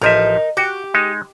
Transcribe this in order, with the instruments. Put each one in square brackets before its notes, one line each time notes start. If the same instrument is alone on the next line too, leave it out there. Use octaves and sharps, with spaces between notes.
[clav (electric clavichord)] A1 F3 E5 [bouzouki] D#4 A#4
[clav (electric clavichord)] F#4 [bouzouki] G4
[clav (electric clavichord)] G#3 D#4